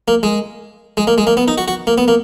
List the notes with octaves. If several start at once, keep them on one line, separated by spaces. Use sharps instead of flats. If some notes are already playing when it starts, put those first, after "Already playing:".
A#3
G#3
G#3
A#3
G#3
A#3
B3
D#4
F#4
F#4
A#3
B3
A#3